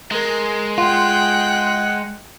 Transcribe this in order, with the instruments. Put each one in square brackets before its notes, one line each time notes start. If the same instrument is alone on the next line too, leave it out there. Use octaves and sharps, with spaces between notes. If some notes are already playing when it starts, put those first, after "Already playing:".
[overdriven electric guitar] G#3 [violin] A#4
[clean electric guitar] F4 [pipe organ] F#5 [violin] G5 F#6